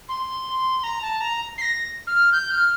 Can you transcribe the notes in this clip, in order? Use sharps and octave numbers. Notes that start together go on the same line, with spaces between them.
C6
A#5
A5
A#5
C7
A#6
F6
G6
F6